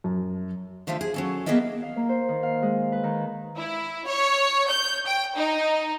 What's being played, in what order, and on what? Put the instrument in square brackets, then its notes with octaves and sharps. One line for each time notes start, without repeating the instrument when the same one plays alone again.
[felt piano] F#2
[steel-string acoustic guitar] D3 F3 A3 E5 F5
G#4
F#3 C#4 A4
A#3 B3 G#4 A#4 D#5 E5
[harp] F5
A#3
C5
D#3
F5
G#3
B4
D#3
[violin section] E4
C#5
G6
G5
D#4